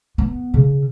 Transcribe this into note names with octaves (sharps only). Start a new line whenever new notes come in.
B3
C#3